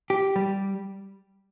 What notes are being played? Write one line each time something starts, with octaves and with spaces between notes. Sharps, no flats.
G4
G3